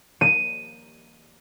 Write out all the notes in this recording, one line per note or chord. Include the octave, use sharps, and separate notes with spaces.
D#7